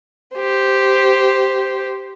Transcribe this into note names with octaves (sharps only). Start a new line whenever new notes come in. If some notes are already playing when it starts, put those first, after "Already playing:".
G4 C5